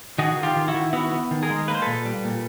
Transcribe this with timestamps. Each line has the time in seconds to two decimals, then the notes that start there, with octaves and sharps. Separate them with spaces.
0.18 D#3 F#4 G#4
0.37 D#3
0.43 F4 G4
0.56 D#3
0.68 E4 F#4
0.74 D#3
0.93 B3 E4 F#4
1.12 B3
1.31 D#3
1.43 G#4 A#4
1.50 G#3
1.68 A#3 B4
1.75 C5
1.82 A#2 A4 B4
2.05 G3
2.24 A#2